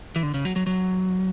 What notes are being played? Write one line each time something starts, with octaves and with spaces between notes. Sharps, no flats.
E3
D3
C#3
F#3
F#3
F#3